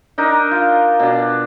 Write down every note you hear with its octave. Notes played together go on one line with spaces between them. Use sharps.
D4 D#4 A#4
F4
B2 D4